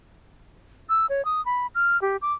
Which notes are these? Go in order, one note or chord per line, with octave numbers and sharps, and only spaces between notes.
E6
C#5
D#6
B5
F6
G4
D6